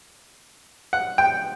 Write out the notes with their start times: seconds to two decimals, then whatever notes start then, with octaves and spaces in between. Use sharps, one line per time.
0.93 F#5
1.18 G5